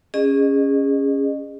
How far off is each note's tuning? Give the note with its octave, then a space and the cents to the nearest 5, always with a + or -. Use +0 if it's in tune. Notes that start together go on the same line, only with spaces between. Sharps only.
C#4 +0 G#4 -25 D#5 -35